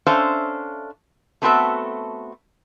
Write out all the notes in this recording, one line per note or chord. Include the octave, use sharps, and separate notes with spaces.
C#4 D4 A4 C5 E5 F5
A3 B3 C4 F#4 A4 E5